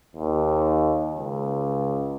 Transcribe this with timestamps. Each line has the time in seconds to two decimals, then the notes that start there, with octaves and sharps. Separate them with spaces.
0.16 D#2
1.18 C#2